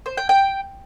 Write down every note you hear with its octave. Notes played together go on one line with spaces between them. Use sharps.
C5
G5
G5